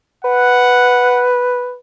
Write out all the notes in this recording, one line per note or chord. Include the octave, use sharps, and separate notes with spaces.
B4 F#5